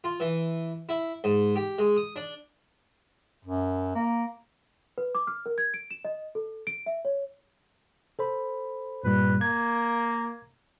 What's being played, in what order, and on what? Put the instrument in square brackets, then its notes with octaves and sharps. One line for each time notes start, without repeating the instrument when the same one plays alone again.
[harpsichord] F4
E3
E4
G#2
G4
G#3
D#6
D4
[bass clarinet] F#2
A#3
[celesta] B4
D6
F6
A#4
G#6
D7
E7
D#5
A4
D7
E5
C#5
[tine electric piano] A4 C5 B5
[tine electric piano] G2 A#2 G3 [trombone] B4
[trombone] A#3 [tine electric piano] G#6